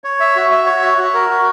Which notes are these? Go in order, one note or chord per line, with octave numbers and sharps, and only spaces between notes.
C#5
E5
F#4
E5
C#5
F#4
F#4
A#4
F#4